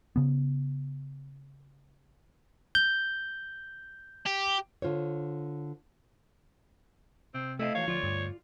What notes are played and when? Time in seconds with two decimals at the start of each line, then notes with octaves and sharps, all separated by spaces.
0.16 C#3 B3
2.75 G6
4.26 G4
4.82 D3 F4 C5 C#5
7.34 C3 C4
7.59 A3 E4 A4 D#5 F5
7.75 A2 E3 F#3 C#5 F5
7.88 D2 F3 F4 D5
8.03 G2